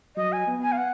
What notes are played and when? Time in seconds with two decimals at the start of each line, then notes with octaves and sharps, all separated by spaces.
0.16 F#3 D#5
0.32 G#5
0.47 B3
0.62 G#5
0.72 F5
0.77 F#5